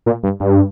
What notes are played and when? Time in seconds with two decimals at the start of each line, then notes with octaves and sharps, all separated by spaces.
0.06 A#2
0.23 G2
0.40 G2